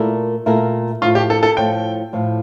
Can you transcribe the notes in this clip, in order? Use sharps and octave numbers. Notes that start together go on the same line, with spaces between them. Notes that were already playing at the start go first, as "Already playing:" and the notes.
Already playing: A#2 A3 E4 A#4
A#2 A3 E4 A#4
A2 F3 A3 F4
G4
A4
A4
A2 F3 A3 G5
A2 F3 A3